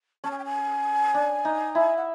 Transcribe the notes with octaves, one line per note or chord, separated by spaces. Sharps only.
C#4 A5
G#5
G5
G#5
D4
D#4
E4
F#5